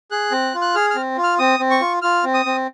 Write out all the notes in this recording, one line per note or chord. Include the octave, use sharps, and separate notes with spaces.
G#4 F#6
C4
F4
F#6
G#4 F6
C4 F6
F4
F6
C4 D#6
C4
C#6
F4
F4 F6
C4
D#6
C4